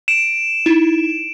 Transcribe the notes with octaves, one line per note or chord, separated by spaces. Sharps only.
D7 E7
D#4 E4